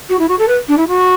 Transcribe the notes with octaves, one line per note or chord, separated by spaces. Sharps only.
F#4
E4
F#4
A4
B4
D4
E4
F#4